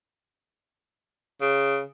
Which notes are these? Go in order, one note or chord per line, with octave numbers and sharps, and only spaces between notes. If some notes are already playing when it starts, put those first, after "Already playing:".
C#3